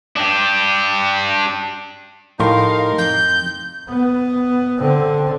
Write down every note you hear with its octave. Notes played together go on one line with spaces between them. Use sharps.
D4 G4
A2 F3 D#4 G4 A#4 F5 C6
F2 A#5 G6
B3
D3 C4